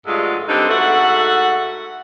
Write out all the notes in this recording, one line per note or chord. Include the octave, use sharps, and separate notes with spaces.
D2 G2 F#3 G#3 F4
D3 G3 C4 D#4 B4
G#2 A3 F#4 A4 F#5